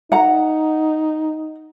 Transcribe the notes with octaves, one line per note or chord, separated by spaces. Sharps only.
D#4 F#5 A#5